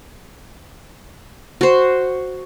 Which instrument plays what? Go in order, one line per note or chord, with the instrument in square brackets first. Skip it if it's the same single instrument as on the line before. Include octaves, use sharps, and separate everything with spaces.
[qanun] F#4 C5